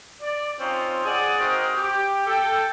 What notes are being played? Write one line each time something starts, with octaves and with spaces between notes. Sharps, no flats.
D5
C4 C#4 D#4 F4
G#4 D5 F#5
C4 D#4 F#4 G#4 A#4 C5
G4
A4 G5